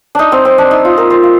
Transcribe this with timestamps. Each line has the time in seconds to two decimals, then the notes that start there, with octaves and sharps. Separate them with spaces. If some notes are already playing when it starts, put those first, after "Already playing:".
0.15 D4 D#4
0.32 C4
0.45 C4
0.58 D4
0.71 D#4
0.85 F4
0.97 A#4
1.10 C5
1.23 F5